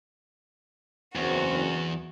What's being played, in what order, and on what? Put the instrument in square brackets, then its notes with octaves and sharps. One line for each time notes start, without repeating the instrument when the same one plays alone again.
[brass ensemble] F#1 C4 [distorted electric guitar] E2 [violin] F#4